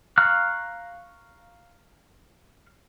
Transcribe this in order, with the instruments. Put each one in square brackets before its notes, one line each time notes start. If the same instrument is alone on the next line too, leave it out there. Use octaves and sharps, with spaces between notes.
[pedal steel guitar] F5 A#5 C#6 F6 F#6